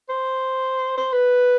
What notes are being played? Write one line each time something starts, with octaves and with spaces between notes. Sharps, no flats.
C5
C5
B4